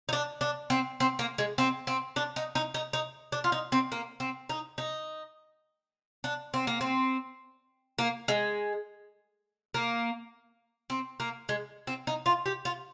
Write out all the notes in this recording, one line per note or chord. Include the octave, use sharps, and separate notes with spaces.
D#4
D4
D4
C4
C4
A#3
G#3
C4
C4
D4
D#4
D#4
D#4
D#4
D4
F4
D#4
C4
A#3
C4
D#4
D#4
D4
C4
A#3
C4
A#3
G#3
A#3
C4
A#3
G#3
C4
D#4
F4
G4
F4